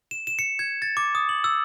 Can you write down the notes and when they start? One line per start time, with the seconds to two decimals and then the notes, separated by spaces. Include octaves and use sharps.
0.11 E7
0.27 E7
0.39 C#7
0.59 G#6
0.82 A6
0.97 D6
1.15 D#6
1.29 F#7
1.44 E6